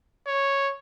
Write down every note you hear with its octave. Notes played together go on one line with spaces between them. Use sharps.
C#5